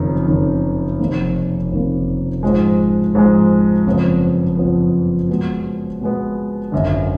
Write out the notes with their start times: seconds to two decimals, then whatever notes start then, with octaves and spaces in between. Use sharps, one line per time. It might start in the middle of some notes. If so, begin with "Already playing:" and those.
Already playing: F#1 F2 D#3
0.28 F#1 F2 D#3
0.99 F1 F2 D#3 A#3
1.71 F1 F2 D#3 A#3
2.43 G#2 F3 G#3
3.15 G#2 F3 G#3
3.87 F#1 F2 F3 B3
4.57 F#1 F2 F3 B3
5.29 B2 G#3 B3
6.01 B2 G#3 B3
6.72 G#1 F#2 D3